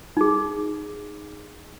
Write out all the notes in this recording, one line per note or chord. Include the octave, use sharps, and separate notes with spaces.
D#4 G#4